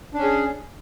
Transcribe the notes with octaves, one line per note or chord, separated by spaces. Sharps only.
C#4 D4 G#4